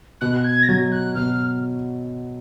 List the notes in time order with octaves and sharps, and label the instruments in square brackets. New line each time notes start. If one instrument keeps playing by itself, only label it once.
[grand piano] B2 [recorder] F#6
[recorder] G#6
A#6
[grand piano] F#3 [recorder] G#6
[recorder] F#6
[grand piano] B2 [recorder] F6